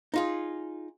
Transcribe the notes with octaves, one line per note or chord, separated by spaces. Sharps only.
D#4 F4 G#4